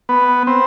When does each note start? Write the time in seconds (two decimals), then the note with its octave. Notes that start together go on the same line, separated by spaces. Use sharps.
0.09 B3
0.47 C4